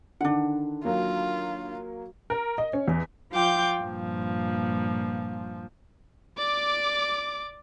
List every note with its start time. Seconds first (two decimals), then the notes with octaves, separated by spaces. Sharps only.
0.21 D3 D#3 D4 F#5
0.85 F#3 A#3 F4
2.30 A#4
2.58 D#5
2.73 C#4
2.88 E2
3.32 F3 F4 G5 D6 G6
3.80 G2 A#2 F3
6.38 D5 D6